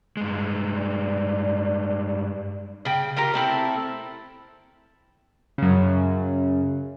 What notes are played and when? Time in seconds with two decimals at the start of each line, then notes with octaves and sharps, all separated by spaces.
0.17 G2 G#3
0.75 D5
2.85 C#3 G5
3.16 F4 G4 A#4 A#5
3.34 A3 C4 E4 A4
5.58 F#2 C#3